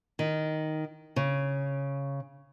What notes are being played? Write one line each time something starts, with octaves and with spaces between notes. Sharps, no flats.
D#3
C#3